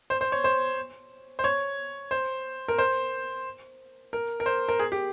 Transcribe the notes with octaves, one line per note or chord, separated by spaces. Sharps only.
C5
C5
C#5
C5
C5
C#5
C5
A#4
C5
A#4
A#4
C5
A#4
G#4
G4